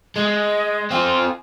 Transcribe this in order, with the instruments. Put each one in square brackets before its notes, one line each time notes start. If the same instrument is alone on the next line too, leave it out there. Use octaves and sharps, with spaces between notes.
[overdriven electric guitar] G#3 [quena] D#5
[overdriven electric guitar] C4 F4 [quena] G#5